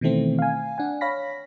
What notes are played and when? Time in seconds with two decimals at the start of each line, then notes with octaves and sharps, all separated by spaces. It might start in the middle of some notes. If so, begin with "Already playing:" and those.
0.01 B2 D#3 E3 A3 C4
0.39 F5 G#5
0.78 D4 F#5 G#5
1.01 C#5 F5 B5 A#6 B6